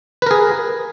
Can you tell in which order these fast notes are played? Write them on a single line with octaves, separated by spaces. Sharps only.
B4 A#4 G#4